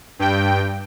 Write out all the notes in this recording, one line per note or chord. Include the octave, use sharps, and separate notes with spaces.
G2 G5